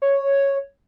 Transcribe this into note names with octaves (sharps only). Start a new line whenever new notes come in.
C#5